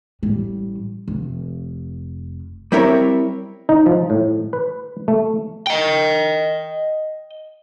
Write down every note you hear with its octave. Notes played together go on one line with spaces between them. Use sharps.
A1 G3
F1
G3 C4 E4 A#4 C#5
D#4
F3
A2
B4
A3
D#5 G5